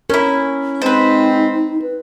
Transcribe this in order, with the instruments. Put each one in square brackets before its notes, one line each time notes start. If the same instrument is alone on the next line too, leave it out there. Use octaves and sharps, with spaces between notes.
[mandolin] C#4 E4 [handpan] A#4
[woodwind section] G#3 C4 [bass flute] D#4 [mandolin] B4 C5
[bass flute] B4